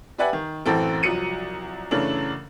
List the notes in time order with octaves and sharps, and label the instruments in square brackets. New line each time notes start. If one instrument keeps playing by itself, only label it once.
[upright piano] G4 B4 D5 E5 F#5 G#5
D#3
A1 F#2 E3 C4 A4
C2 F3 F#3 C#7 D#7
F#2 C#3 E3 A3 C#4 D4